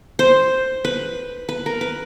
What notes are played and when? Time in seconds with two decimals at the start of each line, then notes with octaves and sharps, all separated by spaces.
0.19 C5
0.85 B4
1.49 B4
1.66 A#4
1.81 B4